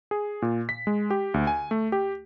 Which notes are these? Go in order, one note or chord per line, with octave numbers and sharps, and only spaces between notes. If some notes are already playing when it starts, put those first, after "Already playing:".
G#4
A#2
B6
G#3
G4
D2
G#5
A3
G4